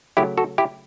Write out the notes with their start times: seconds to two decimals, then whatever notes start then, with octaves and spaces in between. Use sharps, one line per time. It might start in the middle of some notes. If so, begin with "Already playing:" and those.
0.17 C#3 F#3 A3 E4 G4
0.37 F#4 A4
0.58 E4 G4